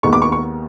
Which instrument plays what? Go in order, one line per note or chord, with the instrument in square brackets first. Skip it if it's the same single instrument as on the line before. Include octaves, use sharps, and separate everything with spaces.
[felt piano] D#2 D#3 G#3 B3 [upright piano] C#6
[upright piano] D6
C#6
C#6